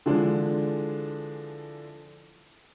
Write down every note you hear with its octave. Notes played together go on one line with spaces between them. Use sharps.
D3 E3 F3 G#3 D4